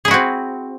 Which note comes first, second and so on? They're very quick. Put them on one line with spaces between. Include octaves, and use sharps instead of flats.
G#4 E4 F#4 C4